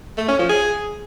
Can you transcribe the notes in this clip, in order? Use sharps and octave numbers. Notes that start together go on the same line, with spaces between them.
A3
C#4
F3
G#4